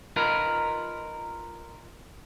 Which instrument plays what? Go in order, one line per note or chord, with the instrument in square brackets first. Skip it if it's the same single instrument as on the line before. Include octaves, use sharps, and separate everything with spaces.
[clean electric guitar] D#4 F4 A#4 B4